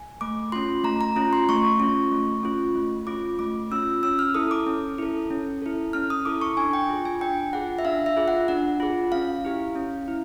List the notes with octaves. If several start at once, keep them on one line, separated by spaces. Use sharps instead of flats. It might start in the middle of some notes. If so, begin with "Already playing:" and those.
Already playing: G#5
A3 D6
C#4 F4 C6
A3 A#5
A#5
C#4 F4
C6
A3 C#6
C#4 F4
A3
C#4 F4
A3
C#4 F4 D6
A3 D6
C#4 F4 E6
C#4 E6
F6
E4 A4 D#6
D6
C#4
E4 A4
C#4
E4 A4
C#4 F6
D#6
E4 A4 D6
C#6
D4 G#5
G5
F4 G#4
G#5
D4 G5
F4 G#4 F#5
E5
D4 F5
E5
F4 G#4
F#5
D4 F#5
F4 G#4
C#4 F5
E4 G4
C#4
E4